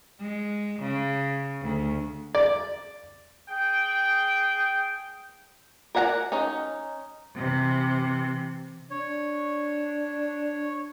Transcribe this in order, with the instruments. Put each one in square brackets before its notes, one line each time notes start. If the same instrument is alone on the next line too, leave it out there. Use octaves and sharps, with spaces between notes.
[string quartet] G#3
C#3
D2
[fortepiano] D5
[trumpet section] G#4 G5
[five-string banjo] A#4 D5 F#5 G#5 A#5
C#4 D#4
[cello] C3 E3
[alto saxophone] D4 [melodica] C#5